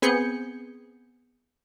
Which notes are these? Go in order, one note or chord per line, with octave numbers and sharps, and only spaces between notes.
B3 C4 G#4 G6 G#6 C#7